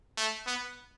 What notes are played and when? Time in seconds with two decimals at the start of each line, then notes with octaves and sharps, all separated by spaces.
0.17 A3
0.47 B3